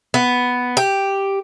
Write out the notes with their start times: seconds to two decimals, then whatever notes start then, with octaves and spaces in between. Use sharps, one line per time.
0.14 B3
0.77 G4